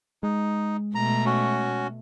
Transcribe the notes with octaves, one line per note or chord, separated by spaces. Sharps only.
G#3 D#4
B2 A3 A#5
C#4 F#4